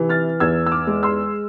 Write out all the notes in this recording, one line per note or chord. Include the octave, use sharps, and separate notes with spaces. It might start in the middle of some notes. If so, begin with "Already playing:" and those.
Already playing: C3 E3
F6 A6
E2 E6 G#6
E6
D6 F6
G#3
C6 E6